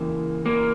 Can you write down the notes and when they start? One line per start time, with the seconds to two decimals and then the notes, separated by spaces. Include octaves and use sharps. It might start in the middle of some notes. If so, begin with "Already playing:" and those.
Already playing: C#3 E3 A#3
0.46 A#3